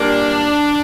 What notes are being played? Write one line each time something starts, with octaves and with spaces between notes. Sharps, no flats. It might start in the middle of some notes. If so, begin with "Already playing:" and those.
Already playing: A#2 G3 A#3 D4